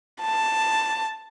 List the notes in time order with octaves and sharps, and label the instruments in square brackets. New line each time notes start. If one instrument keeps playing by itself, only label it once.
[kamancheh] A5